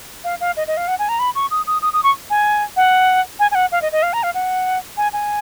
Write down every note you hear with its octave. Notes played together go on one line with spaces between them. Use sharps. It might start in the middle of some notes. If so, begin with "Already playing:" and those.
F5
F5
D#5
D#5
F5
F#5
G#5
A#5
B5
C#6
D#6
D#6
D#6
D#6
C#6
G#5
F#5
G#5
G#5
F#5
F5
D#5
D#5
F5
A#5
F5
F#5
G#5
G#5